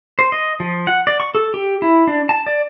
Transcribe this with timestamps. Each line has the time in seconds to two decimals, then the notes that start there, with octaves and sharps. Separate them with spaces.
0.19 C5
0.32 D#5
0.60 F3
0.87 F#5
1.07 D5
1.20 C#6
1.35 A4
1.54 G4
1.82 E4
2.07 D4
2.29 A5
2.46 D5